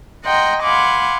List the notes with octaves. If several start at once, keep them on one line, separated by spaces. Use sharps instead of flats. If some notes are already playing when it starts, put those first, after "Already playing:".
D#5 F#5 G5 A#5 C6
F5 F#5 G#5 B5 C6 D6